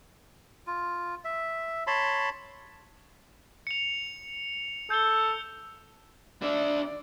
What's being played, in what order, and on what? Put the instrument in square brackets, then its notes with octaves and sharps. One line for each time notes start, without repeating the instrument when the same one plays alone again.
[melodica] F4
E5
C#5 A5 B5 C6
[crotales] C#7 F7
[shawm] A4 [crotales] G6 G7
[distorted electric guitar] D4 E5 [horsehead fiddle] D5